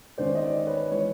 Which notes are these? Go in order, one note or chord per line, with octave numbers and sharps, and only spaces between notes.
G#2 D#3 G#3 C#4 C5 D5
D#5
C5 D5
B4 C#5
E3 G#3 B4 C#5